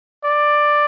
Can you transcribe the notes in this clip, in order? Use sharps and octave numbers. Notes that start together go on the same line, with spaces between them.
D5